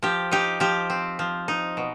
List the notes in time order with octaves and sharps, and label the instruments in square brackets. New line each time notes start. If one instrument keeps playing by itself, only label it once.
[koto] F3 G4
D#4 G4
F3 G4
C4
F3
D#4
B2